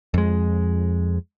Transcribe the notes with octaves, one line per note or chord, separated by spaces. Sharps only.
F2 G#3